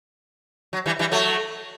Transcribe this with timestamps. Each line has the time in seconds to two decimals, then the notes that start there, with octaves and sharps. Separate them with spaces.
0.73 F#3
0.86 E3 G3
0.99 E3 G3
1.11 F#3 A3